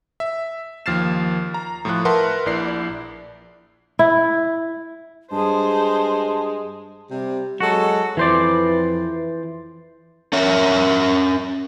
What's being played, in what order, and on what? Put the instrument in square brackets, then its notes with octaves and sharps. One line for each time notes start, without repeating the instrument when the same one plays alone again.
[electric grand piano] E5
D#2 F3 F6 A6 C7 E7
A#5
A2 F3 F4 F#6
A#4 B4 E5 F#5 A5 C6
A#1 E4 D5 C7
[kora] E4
[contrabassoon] G2 [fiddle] G#3 G#4 [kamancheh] C5 [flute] A5
[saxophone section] C3 [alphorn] G3
[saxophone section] F#3 A4 [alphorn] G#3 [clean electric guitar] F#4
[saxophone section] F2 [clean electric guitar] E3 C5 D5 [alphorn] B4
[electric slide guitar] C#4 A#4 C#5 E5